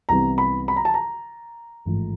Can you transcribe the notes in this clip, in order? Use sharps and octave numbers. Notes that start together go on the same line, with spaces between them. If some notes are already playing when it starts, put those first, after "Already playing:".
C2 C3 E3 G3 B3 A#5
B5
B5
A#5
A5
A#5
A1 G#2 F3 A3